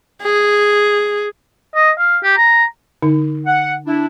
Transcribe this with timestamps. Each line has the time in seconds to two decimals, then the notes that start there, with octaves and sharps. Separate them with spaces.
0.22 G#4
1.75 D#5
1.99 F5
2.23 G4
2.37 A#5
3.02 D3 D#4
3.46 F#5
3.86 D4 E4